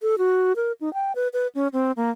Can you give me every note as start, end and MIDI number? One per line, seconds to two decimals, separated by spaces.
0.02 0.15 69
0.18 0.52 66
0.56 0.72 70
0.81 0.93 63
0.94 1.12 79
1.15 1.28 71
1.33 1.47 71
1.55 1.68 61
1.73 1.92 60
1.97 2.11 58